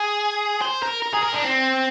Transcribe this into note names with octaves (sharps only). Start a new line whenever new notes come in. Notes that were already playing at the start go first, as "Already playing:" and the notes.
Already playing: G#4
C5
A#4
A#4
G#4
A#4
D4
C4